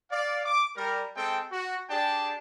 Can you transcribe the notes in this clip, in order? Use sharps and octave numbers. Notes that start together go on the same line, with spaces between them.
D5 F5
D6
G3 A#4
G#3 C4 A4 G5
F#4
D4 G4 G#4 D5 G5 A5